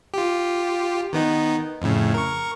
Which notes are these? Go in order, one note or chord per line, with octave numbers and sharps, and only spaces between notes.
F4 G4
D#3 B3 D#4
F2 A2 C#3
A#4 C#6